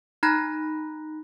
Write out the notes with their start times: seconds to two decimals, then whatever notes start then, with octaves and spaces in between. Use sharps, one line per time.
0.23 D#4 A#5 B5 F#6 A#6